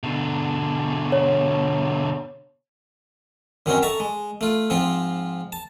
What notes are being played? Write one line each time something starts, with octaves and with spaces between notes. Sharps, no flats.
B2 D3
C#5
F#2 D#3 F#3 C4 C#4 D#4
A4 E5 A5 A#5 C#6
G#3
A3 F4
G#2 F3 C4 F4
A5